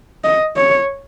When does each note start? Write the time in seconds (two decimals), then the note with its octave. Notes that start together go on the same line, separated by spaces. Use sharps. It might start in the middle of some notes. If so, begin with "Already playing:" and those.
0.24 D#5
0.56 C#5